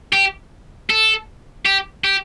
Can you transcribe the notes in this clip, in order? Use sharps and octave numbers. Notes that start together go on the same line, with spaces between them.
G4
A4
G4
G4